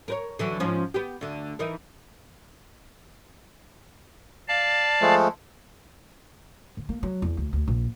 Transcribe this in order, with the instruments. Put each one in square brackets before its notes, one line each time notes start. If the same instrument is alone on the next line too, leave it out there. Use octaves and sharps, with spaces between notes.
[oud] A#4 B4 C#5
D3 E3 F#3
G#2 F3 C#4
B3 G4
D2 D3
E3 D#4 A#4
[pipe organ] D5 F5 A5
[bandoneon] F3 G#3 A3
[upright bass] D3
A#3
F#3
E2
D2
D2
A#1